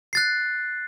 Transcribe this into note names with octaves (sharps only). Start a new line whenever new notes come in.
F#6 A6 C7